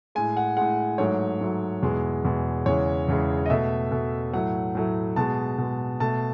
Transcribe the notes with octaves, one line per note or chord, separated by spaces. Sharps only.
A2 G#3 G#5
F#5
A2 G#3 F#5
G#2 F#3 A3 C#5
G#2 F#3 A3
E2 B2 G#3
E2 B2 G#3
E2 C#3 E3 G#3 C#5
E2 C#3 E3 G#3
D#5
B2 A3 E5
B2 A3
A2 F#3 A3 F#5
A2 F#3 A3
B2 G#3 A5
B2 G#3
B2 A3 A5